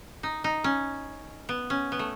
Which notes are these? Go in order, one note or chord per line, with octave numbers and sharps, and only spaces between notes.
D#4
D#4
C#4
B3
C#4
B3
A3